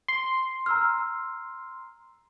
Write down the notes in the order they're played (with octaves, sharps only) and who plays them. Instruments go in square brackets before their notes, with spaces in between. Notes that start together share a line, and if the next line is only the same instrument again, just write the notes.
[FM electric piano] C6
[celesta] A#5 E6 F6